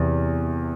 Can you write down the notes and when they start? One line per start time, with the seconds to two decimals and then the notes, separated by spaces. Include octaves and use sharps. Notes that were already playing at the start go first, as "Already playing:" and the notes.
Already playing: E2 C3